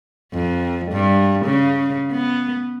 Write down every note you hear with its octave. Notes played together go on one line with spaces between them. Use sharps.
F2
G2
C#3
B3